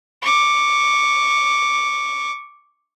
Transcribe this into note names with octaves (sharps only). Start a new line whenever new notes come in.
C#6 D6